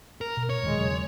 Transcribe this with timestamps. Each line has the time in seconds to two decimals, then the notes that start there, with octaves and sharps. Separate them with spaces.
0.21 A#4
0.37 B2
0.50 C#5
0.63 E1 A#2 D#3 G#3
0.78 E2 C#3 F#3